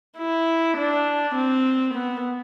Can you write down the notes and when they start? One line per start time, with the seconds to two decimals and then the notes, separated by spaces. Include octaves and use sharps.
0.18 E4
0.77 D4
1.35 C4
1.94 B3